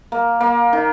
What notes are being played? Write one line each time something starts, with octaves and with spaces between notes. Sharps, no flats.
A#3
A#3
D#3